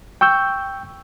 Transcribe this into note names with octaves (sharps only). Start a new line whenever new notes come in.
G5 C#6 E6 G6